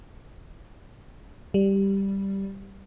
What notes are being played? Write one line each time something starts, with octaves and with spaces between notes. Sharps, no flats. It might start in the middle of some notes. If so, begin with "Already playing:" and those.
G3